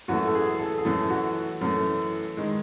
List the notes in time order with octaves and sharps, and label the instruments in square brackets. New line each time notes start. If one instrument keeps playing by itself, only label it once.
[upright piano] F#2 E3 A3 F#4
A4
G#4
A4
G#4
F#2 E3 A3 A4
F#4
F#2 E3 A3
D#3 G#3